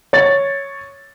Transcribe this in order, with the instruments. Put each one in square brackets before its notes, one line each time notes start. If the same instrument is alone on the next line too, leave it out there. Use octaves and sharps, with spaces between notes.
[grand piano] C#5 A6